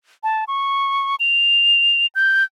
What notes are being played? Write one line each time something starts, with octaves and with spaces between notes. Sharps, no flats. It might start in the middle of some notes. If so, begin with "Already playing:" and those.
A5
C#6
F7
G6